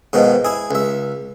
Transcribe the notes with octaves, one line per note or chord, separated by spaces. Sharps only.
G#2 B2 D#3 F3
E4 G#4
C#2 E5